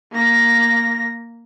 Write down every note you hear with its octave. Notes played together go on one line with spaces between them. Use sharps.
A#3 A#6